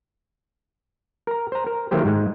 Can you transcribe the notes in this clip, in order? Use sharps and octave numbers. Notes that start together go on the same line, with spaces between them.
A#4 A#5
C5 A#5
A#4
D#3 F#3 A3 A#3 G4 C5
G#2 G#3